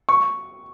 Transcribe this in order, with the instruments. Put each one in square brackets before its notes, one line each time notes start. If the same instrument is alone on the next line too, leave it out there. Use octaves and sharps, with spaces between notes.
[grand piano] C#6